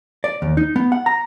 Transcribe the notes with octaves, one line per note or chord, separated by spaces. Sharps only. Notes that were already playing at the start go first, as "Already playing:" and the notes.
D5
D#2
D#4
B3
F#5
A#5